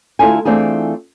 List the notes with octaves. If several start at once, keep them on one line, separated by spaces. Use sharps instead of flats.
D2 E4 F4 A4 G#5
E3 A3 C4 D4 F4 G#4